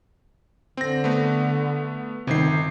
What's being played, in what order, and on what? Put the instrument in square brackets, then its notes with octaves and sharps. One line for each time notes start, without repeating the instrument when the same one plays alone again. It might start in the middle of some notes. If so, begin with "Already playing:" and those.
[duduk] D3 [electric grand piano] C4 A#6
[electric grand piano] A3 B3
[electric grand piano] G1 C7 [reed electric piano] C3 D#3